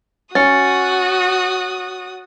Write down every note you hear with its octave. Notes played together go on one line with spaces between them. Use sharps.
C#4 F#4 D#6 A6 C#7